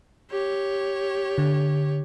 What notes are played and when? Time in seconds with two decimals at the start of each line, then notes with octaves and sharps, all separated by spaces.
0.31 G4 C#5
1.38 D3